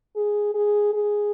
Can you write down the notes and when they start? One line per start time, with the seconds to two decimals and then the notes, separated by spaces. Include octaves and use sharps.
0.16 G#4
0.54 G#4
0.94 G#4